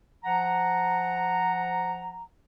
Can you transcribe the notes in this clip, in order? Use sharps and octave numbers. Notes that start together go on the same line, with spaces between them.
F3 F#5 A#5